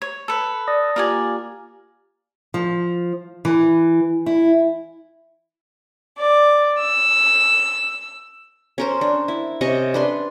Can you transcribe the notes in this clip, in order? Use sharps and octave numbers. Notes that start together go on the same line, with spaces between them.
C#5
A4 B4
D5 D#6 A#6
A#3 F4 G4 A#4 D5 G#5
F3
E3
E4
D5
E6
C#4 A#4 C5
D4
E4
C3 C#4 D#5 C#6
D4 B4 C6